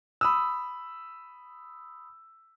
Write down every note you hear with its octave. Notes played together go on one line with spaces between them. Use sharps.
B5 D#6 E6